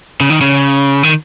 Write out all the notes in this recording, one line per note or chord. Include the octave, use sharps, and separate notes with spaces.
C#3
D#3
C#3
D#3